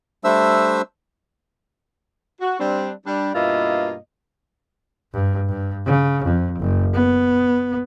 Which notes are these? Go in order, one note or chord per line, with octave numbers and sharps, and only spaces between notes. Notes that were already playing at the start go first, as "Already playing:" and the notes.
G3 A3 D4 C5 E5 E6
F#4
G3 C4 D4
G3 D4
G2 B2 A#3 E4 F4 D#5
G2
G2
C#3
F2
F#1
B3